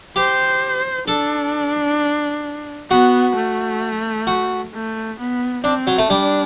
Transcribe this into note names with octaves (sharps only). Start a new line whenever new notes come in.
G4 C5
D4 A4
B3 F#4
A3
F#4
A3
B3
C4 D4
F#3
A3
G3 D4